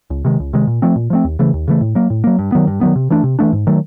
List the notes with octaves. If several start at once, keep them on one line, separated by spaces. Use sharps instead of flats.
C#2
C3 D#3 G#3
C#2
C3 D#3 G#3
A#2
F3 A3 C4
A#2
F3 A3 C4
D#2
C#3 E3 A3
D#2
C#3 E3 A3
A2
F#3 A#3
A2
F#3 A#3
G2
D#3 F#3 B3
G2
D#3 F#3 B3
C3
E3 A3 D4
C3
E3 A3 D4
G#2
D#3 F#3 A3